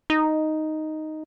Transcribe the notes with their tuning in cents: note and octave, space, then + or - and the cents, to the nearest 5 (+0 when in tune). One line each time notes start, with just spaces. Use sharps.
D#4 +0